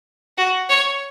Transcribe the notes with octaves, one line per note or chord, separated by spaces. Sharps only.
F#4
C#5